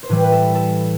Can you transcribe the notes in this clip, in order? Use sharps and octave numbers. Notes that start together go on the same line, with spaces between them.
C5
A2 E3 G3 B4
B4
A4
A4